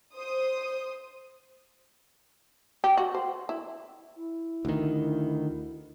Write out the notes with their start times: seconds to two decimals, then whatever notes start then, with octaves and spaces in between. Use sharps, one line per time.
0.16 C5 D#6
2.84 G4
2.97 F#4
3.15 C5
3.49 E4
4.16 E4
4.65 D2 D#3